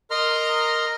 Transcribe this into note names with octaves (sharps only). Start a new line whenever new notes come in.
A#4 D#5 A#5 C6 F6